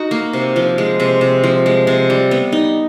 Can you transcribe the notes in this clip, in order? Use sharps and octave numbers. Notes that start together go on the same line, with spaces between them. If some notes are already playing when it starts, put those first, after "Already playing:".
Already playing: D#4 F#4 A#4
A#3
C3
F3
G#3
C3
C3
F3
G#3
C3
G3
B3
D#4